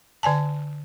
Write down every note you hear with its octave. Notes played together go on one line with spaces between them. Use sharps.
D3 D5 G#5 A5